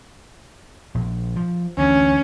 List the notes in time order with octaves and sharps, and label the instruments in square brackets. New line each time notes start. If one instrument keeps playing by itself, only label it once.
[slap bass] A#1
F3
[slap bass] D2 E3 [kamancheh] C#4